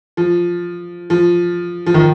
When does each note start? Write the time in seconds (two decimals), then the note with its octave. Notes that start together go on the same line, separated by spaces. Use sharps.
0.17 F3
1.10 F3
1.86 F3
1.94 D#3